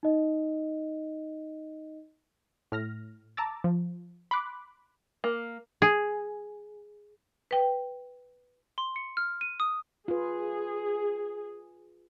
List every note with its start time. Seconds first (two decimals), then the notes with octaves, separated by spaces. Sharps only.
0.03 D#4 D#5
2.72 A2 F6 A#6
3.37 A5 A#5 D6 E6 A6
3.64 F3
4.31 B5 C6 D6 F#6
5.24 A#3
5.82 G#4
7.51 B4 G5
8.78 C6
8.96 C#7
9.17 F6
9.41 D#7
9.60 D#6
10.08 F4 G#4 B4